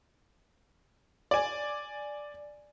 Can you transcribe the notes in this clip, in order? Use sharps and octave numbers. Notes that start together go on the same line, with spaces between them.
D5 G#5